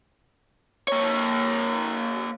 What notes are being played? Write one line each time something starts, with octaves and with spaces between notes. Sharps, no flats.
A#3 C#5